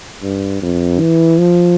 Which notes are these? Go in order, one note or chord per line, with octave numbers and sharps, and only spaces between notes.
G2
F2
E3
F3